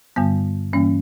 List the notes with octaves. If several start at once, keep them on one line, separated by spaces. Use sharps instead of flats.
G2 D3 G3 B3
G2 E3 G3 A#3 C#4